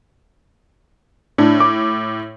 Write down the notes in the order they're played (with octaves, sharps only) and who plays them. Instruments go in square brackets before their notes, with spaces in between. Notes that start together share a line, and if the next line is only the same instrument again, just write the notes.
[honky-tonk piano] A2 [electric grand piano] D4
[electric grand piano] D6